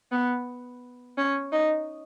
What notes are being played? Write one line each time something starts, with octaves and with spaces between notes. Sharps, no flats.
B3
C#4
D#4